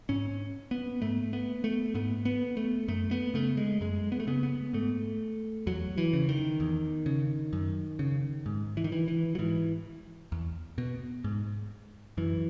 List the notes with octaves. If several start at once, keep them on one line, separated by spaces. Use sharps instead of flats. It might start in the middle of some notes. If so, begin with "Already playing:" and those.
G#2 C#4
B3
G#2 A3
B3
A3
G#2 B3
B3
A3
F#2 A3
B3
C#3 A3
G#3
F#2 G#3
B3
A3
C#3 B3
B3
G#2 A3
E2 F#3
E3
C#3
D#3
E2
C#3
F#2
C#3
G#2
E3
D#3
E3
E3
F#3
G#2 E3
E2
B2
G#2
F#2 E3